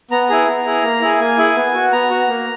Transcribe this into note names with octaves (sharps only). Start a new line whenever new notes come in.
B3 A#5
E4 G#4
B3
E4 G#4
A#3
E4 G#4
A#3 G#5
E4 G#4
B3
F#4
B3 A#5
F#4
A#3